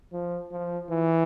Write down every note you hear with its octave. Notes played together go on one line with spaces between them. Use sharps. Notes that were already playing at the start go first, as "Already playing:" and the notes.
F3
F3
E3